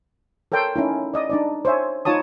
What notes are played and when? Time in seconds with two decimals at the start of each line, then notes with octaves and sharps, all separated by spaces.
0.52 A4 A#4 C#5 G5 A5 C6
0.76 C#4 D#4 E4
1.14 D5 D#5 D#6
1.30 D4 D#4 D5
1.65 C5 C#5 E5 G#5
2.05 D#4 F4 C#5 A5 D#6